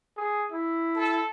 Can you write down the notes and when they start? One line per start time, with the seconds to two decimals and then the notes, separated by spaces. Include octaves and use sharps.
0.17 G#4
0.52 E4
0.96 A4